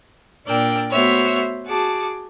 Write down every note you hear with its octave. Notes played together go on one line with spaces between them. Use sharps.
A#2 D4 A#4 D5 G5 E6
A3 B3 F#4 C5 C#5 E5
F#4 G#4 A5 D6